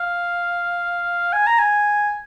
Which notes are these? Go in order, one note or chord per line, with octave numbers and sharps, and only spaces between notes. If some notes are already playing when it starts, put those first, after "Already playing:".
Already playing: F5
G#5
A#5
G#5